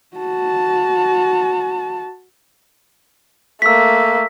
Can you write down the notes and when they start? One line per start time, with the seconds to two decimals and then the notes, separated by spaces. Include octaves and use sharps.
0.17 F#4 A5
3.62 A3 A#3 E6 B6